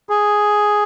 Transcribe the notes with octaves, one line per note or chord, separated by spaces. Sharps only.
G#4